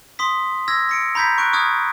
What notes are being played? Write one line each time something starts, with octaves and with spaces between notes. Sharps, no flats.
C6 D#6 B6
E6 G#6 A#6
A#6 C#7 D7
A#5 B5 G6 G#6 B6
C#6 F#6 D7
C#6 D#6 F6 G#6